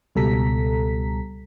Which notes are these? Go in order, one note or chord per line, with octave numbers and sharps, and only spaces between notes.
C#2 B2 G3 A4 A#5 B6